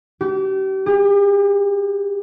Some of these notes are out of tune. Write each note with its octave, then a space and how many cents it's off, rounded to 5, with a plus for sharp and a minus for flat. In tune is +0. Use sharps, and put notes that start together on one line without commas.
G4 -35
G4 +45